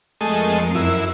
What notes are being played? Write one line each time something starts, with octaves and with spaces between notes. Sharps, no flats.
F2 G#3 A3 A#4 D#5 C7
F#2 E4